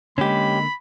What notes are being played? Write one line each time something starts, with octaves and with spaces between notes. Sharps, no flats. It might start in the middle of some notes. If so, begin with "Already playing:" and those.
D3 G#3 A#3 C#4 G4 B5